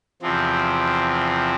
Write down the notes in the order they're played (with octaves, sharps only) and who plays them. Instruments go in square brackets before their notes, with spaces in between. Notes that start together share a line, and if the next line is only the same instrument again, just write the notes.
[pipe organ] E2 C3 F3 C4